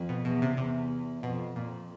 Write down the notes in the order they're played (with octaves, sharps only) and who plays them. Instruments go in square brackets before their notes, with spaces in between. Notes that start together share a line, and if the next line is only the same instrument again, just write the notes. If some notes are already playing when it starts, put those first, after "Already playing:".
Already playing: [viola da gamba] F2
[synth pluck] B2
[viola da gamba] E2 [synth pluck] B2
[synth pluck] C3
[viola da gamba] E2 [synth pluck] C3
[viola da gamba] F2 [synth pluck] B2
[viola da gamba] F2 [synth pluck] A#2